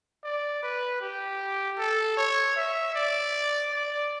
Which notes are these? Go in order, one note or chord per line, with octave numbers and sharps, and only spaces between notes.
D5
B4
G4
A4
C#5
E5
D5
D5